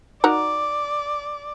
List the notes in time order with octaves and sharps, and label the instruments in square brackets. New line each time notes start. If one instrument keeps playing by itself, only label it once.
[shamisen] D#4 F#4 A#4 [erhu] D5